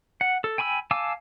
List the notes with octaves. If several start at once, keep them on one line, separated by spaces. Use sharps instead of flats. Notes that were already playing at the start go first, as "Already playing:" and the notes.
F#5
A4
G5 G#5 B5 C#6 E6
F5 G#5 A5 D6 E6